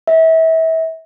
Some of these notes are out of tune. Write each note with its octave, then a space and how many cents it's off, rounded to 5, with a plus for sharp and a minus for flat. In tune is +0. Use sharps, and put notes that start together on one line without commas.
E5 -30